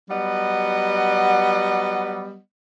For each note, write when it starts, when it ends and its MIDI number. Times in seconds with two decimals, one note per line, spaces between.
0.09 2.36 54
0.09 2.36 55
0.09 2.36 59
0.09 2.36 75
0.09 2.36 78